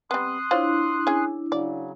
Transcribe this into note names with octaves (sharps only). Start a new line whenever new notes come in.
G3 B3 C4 C6 D#6 F#6
D4 E4 F4 C5 C#5
C#4 G#4
C#3 F#3 D5